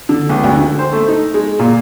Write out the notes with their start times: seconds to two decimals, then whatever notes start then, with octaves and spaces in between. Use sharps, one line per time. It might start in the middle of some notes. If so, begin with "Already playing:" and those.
0.09 D3
0.29 C#2
0.44 D2
0.57 D3
0.79 C5
0.93 A3
1.08 D#4
1.34 G#3
1.59 A#2